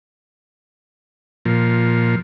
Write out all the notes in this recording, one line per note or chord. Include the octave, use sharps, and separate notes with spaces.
A#2 F3